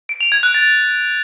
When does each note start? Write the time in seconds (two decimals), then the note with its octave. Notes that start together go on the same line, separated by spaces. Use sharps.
0.09 D7
0.21 F7
0.32 G#6
0.43 F#6
0.54 A6